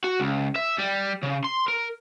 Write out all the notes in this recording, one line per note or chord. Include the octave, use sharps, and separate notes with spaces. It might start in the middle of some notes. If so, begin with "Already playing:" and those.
F#4
C#2
E5
G3
C#3
C6
A#4